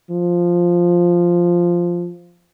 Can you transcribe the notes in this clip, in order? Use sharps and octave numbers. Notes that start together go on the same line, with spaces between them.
F3